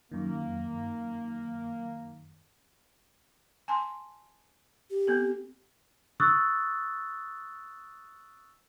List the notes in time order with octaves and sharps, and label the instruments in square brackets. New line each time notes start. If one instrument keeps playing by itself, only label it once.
[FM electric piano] F#2 D#3 [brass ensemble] A#3
[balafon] G#5 A5 C6
[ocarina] G4
[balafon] B3 C4 A4
[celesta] C#6 D#6 E6 F#6 A6